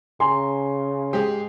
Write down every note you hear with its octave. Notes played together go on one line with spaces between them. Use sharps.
C#3 G#5 A#5 C6
G#3 G4 G#4 C5